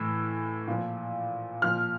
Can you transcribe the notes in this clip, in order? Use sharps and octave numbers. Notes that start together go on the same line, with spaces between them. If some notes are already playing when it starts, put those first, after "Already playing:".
Already playing: A2 E3 E6
A#2 F3
A#2 F3 F6